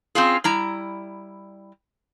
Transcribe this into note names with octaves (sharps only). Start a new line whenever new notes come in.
C4 C#4 F4 G#4
G3 E4 A#5